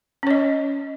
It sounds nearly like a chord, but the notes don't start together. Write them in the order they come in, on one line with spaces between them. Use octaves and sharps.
C#4 C#5 D#5